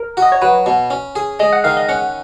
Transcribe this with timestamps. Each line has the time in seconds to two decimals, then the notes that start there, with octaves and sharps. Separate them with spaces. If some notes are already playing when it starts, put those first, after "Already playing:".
Already playing: A#4
0.17 F#4
0.22 D#5
0.32 C#5
0.42 F#3 B4
0.66 B2
0.90 C#4
1.16 G#4
1.40 G#3 D#5
1.53 F#5
1.64 D#3 F5
1.77 D#5
1.88 C#4 F#5